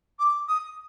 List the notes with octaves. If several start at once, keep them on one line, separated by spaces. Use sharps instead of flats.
D6
D#6